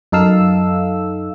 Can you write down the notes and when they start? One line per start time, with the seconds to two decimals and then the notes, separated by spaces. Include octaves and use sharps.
0.12 F#2 D#4 A4 F5 E6